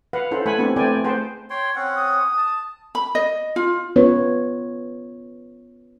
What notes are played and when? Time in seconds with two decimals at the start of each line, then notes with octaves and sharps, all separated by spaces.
0.13 B4 F5 F#5
0.31 C#4 E4 A4 C5 F#5
0.46 A3 A4 F#5 G#5 B5
0.59 B3 C4 D4 E4 G4
0.76 A3 C4 B4 D5 G5 G#5
1.04 G#4 B4 C5 F#5 G5 A5
1.50 C#5 G5 C6
1.75 C4 C#4 F#5
1.96 D#6
2.37 A5
2.95 B5
3.15 D#5
3.56 F4
3.96 B3 C#4 F4 B4 C#5